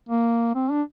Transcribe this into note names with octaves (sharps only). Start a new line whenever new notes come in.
A#3
C4
D4